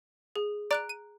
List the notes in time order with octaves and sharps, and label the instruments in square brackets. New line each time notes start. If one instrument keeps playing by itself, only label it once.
[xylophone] G#4
[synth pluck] D5 [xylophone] A#5 F#6 D7
[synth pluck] D#7